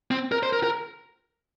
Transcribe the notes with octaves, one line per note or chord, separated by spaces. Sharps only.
C4
A#4
C5
A#4
A#4